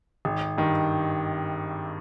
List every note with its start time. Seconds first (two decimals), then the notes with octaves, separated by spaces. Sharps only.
0.25 G#1
0.57 G2 D#3